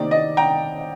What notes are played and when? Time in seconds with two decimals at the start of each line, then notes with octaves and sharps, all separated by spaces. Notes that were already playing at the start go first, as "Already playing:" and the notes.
Already playing: C3 D#3 A#3 D#4 D5
0.11 D#5
0.37 G5 A#5